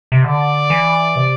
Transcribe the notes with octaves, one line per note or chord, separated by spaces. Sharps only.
C3
D3 D5
E3
C3